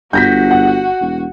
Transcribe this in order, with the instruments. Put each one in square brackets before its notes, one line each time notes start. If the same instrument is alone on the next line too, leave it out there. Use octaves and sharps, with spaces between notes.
[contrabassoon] G1 [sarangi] F#4 [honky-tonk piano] G6 A#6 B6
[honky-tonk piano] F#5
[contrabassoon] E1